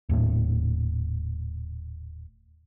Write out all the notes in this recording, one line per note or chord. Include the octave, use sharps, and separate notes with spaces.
D#1 A2